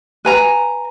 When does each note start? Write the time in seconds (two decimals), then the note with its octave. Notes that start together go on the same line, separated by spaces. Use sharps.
0.25 B4 G#5 A#5